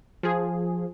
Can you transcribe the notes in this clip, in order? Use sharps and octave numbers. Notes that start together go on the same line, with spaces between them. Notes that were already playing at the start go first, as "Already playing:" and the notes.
F3 G#4